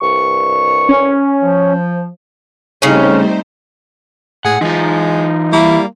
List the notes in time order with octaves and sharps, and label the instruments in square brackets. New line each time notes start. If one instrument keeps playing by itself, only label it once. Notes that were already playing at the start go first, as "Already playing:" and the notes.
[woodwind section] C2 G2 C#6
[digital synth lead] C#4
[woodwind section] F3
[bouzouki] C#3 C#4 [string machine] G3 A3 C5 [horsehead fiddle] C4 D#4
[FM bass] A2 [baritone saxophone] G#4 [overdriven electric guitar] F#5
[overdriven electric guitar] E3 F4 [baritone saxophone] G#3 [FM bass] D#4
[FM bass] G3 [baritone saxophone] A#3 [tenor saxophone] E4